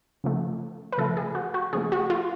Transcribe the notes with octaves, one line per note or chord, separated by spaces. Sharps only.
C#3 F3 A3
B4
C#3 F3 A3 A4
G#4
F#4
F#4
C#3 F3 A3 G#4
F#4
F4